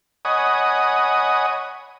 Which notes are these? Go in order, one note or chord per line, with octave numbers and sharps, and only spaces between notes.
C#5 D#5 F#5 G#5 B5 D#6